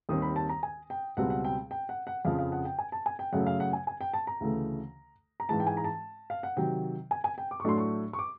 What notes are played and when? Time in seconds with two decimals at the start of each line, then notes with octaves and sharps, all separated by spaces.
0.09 D#2 D#3 G3 C4 D#6
0.22 B5
0.36 A5
0.49 A#5
0.63 G#5
0.90 G5
1.17 C#2 B2 G3 C4 F#5
1.30 F#5
1.45 G5
1.71 G5
1.89 F#5
2.07 F#5
2.25 F2 C#3 F3 F5
2.39 F5
2.52 F#5
2.65 G5
2.79 G#5
2.92 A5
3.06 G#5
3.19 G5
3.33 F#2 C#3 F#3 A3 F#5
3.47 F5
3.60 F#5
3.73 G#5
3.87 G#5
4.01 G5
4.14 A5
4.27 A#5
4.40 D2 C#3 E3 A3
5.40 A#5
5.49 G#2 E3 G#3 A5
5.60 G5
5.67 G#5
5.77 A#5
5.84 A5
6.30 F5
6.43 F#5
6.57 C3 D#3 F#3 G5
7.11 G#5
7.24 G#5
7.38 G5
7.51 D6
7.60 C#6
7.64 A2 F#3 A3 D4 C6
7.78 C#6
8.13 C#6
8.19 D6